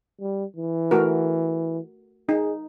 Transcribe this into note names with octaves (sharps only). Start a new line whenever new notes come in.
G3
E3
A3 F#4 A#4
D#4 G#4